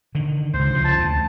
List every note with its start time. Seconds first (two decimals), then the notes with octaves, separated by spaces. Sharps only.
0.15 D3 D#3
0.54 C#2 C5
0.71 C#3 F3
0.85 A5
0.98 D2